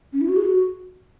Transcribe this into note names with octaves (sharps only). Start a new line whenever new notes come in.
C#4
E4
F#4
G#4
F#4